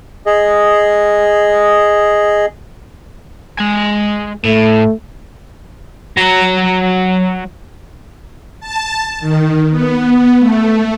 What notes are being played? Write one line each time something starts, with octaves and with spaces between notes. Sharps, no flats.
G#4 D#5
G#3 G#5
A2 A3
F#3 A#5
A5
D#3
B3
A3